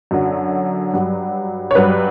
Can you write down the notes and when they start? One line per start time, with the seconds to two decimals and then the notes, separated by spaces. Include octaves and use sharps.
0.11 F#2 D3 F#3
0.94 G2 F#3
1.71 C#5
1.75 G2 F#3 B4